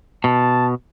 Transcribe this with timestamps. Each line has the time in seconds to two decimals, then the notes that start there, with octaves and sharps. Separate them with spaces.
0.24 B2 A5